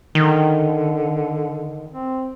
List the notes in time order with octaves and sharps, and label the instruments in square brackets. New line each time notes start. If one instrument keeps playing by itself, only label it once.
[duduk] D3 [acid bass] D#3
[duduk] C4